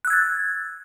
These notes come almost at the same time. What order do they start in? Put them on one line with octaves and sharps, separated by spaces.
F#6 E6 G#6 A6